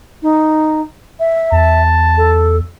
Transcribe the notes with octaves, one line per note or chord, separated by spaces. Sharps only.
D#4
E5
E2 A5
A4